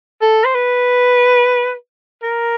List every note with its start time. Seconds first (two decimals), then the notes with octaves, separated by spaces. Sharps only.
0.22 A4
0.44 C5
0.55 B4
2.23 A#4